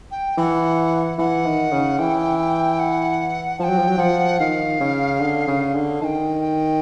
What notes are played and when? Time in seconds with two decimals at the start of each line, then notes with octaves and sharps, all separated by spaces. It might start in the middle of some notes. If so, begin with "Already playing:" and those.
0.11 G5
0.37 E3 G5
0.42 F#5
1.18 E3 F#5
1.46 D#3
1.72 C#3
1.99 E3 G5
2.79 F#5
3.59 F3 A5
3.64 G5
3.69 F#3
3.78 F3
3.88 F#3
3.97 F3 F#5
4.40 D#3 F5
4.80 C#3
5.20 D3
5.47 C#3
5.74 D3
6.01 D#3 G5 A5
6.41 G5